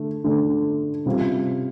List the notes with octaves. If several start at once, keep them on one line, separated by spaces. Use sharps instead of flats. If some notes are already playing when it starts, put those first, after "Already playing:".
Already playing: D3 A3
D3 A3 D4
C3 G3 C4 F4